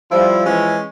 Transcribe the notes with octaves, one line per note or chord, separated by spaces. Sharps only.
F3 G3 E4 F4
E3 G#3 C#4